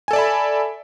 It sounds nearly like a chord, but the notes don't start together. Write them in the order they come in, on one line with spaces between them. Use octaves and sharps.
G#5 A4 D5 E5 B5